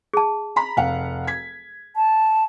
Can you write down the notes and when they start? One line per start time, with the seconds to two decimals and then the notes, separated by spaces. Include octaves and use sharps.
0.14 G#4 A5
0.56 A#5 B5 B6
0.77 F1 F5 F#5
1.27 G#6 B6
1.96 A5